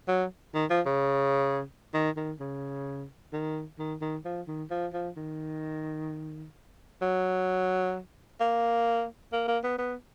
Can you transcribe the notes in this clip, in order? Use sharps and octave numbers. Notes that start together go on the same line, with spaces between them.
F#3
D#3
F3
C#3
D#3
D#3
C#3
D#3
D#3
D#3
F3
D#3
F3
F3
D#3
F#3
A#3
A#3
A#3
B3
B3